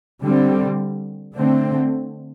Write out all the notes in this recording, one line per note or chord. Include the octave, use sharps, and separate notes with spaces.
D3 G3 C4
D3 A3 C4